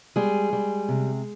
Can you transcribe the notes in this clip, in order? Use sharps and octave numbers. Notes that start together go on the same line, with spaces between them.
G3 G#3 G#4
G3
C3